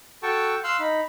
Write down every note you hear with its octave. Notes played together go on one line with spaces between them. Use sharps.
F#4 A4 G5 A5 C#6
F5 C6 E6 F#6
D#4 B5